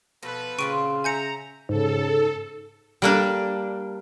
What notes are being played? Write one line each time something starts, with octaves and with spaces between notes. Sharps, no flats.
B2 F3 A4 B4
A#2 C#3 C4 F4 C#6 D7 D#7
E5 G#5 A#5 G6 C#7
G#2 C#3 A4
G3 A#3 D4